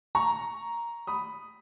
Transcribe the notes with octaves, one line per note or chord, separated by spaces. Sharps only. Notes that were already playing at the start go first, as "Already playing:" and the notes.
A#5 C#6
B5 D#6